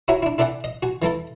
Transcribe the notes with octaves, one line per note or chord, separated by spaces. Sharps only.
E4 F#4 C#5 E5 A#5
D4 E4
E4 A4 D5 E5 F#5 G#5
D#5
F#4 G#5
E3 A3 E4 A4